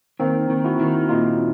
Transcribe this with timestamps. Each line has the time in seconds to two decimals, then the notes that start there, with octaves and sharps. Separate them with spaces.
0.20 D#3 A#3 C4
0.50 D#3
0.64 E4 F#4
0.80 D#3
1.09 A#2 D#4 F4